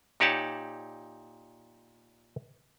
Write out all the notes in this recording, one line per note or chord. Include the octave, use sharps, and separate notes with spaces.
A#2 D#4 G4 C#5 F#5 A5